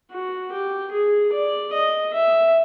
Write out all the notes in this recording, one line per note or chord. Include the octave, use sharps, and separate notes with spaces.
F#4
G4
G#4
D5
D#5
E5